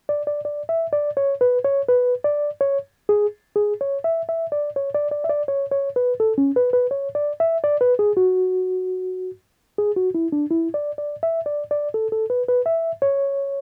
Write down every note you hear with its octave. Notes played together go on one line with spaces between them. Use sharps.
D5
D5
D5
E5
D5
C#5
B4
C#5
B4
D5
C#5
G#4
G#4
C#5
E5
E5
D5
C#5
D5
D5
E5
D5
C#5
C#5
B4
A4
C#4
B4
B4
C#5
D5
E5
D5
B4
G#4
F#4
G#4
F#4
E4
D4
E4
D5
D5
E5
D5
D5
A4
A4
B4
B4
E5
C#5